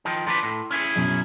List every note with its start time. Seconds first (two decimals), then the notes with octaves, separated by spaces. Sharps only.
0.05 D#3 F3
0.27 F3 D4 B4 A#5 C6 D6
0.43 A2
0.71 C#4 E4 G#4
0.96 F#2 B2